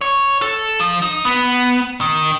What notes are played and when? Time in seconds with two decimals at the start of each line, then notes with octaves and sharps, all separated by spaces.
0.01 C#5
0.42 A4
0.80 F3
1.02 D#4
1.25 B3
2.01 D#3